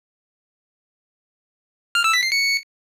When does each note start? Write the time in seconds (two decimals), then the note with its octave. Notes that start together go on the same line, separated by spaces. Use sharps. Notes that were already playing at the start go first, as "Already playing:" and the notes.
1.95 F6
2.04 E6
2.13 B6
2.23 C7
2.32 C#7